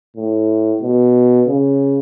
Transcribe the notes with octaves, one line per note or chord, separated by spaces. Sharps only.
A2
B2
C#3